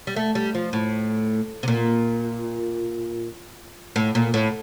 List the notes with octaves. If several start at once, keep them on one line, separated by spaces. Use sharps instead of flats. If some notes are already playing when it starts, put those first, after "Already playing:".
G3
A3
G3
F3
A2
C3
A#2
A2
A#2
A2